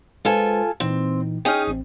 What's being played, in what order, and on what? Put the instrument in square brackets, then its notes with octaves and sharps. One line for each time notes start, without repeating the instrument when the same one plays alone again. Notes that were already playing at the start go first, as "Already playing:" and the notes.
[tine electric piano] G#3 B4 C5 [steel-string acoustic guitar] F4 A4 G#5
[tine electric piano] A#2 E3 D#4 [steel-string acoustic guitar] C4
[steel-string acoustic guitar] C#4 D#4 G#4 [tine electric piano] G5 G#5 F6
[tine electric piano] A1 C4